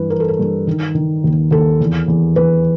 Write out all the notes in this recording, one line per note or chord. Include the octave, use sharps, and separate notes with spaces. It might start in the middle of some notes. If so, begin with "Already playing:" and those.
Already playing: G2 E3 B4
E3 A#4
A4
A#4
G2
D#3
D#3
D#2
D#2 A4
E2
E2
E2 B4